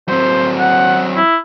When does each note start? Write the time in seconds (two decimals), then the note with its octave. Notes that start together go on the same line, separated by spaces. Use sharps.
0.08 F#3 C4 C5
0.60 F#5
1.16 E4